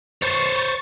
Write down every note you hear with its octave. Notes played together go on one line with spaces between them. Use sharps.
C5 C#5 C#6 A6